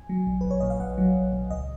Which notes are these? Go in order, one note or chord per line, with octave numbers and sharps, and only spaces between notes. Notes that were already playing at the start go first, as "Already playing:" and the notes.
Already playing: G#5
F#3
A#1
A#1 B4
C#5
A#2 D#5
F5
A#1 F#5
F#3
A#1
A#1
C#2 D#5